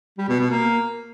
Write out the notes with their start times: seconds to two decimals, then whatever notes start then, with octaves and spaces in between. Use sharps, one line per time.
0.18 G3
0.29 B2
0.40 B2
0.51 A#3